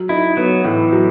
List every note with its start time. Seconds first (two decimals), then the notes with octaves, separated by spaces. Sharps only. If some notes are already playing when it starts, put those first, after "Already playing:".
Already playing: F#3
0.09 D#4 E4
0.37 F#3 B3
0.64 A2 E3
0.92 F#3